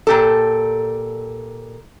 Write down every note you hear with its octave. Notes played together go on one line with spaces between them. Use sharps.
A#2 G4 A4